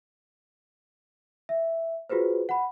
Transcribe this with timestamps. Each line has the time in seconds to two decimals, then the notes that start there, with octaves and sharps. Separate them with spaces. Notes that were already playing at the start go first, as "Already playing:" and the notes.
1.49 E5
2.10 F4 F#4 G#4 B4 C5
2.49 F#5 B5